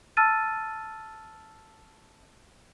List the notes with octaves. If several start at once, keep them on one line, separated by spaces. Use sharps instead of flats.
A5 E6 F6 A6 D#7